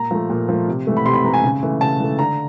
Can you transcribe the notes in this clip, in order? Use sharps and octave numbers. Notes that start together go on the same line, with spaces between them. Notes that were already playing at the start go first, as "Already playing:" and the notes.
Already playing: A#2 A#5
F3 A3
A#2
F3 A3
C3
E3 A3
B5
C3 C6
B5
E3 A3 A#5
G#5
C#3
E3 A3
C#3 A5
E3 A3
D3 A#5